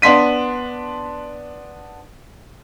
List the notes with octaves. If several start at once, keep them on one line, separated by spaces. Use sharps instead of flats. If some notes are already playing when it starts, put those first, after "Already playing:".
B3 D4 C6 B6 D#7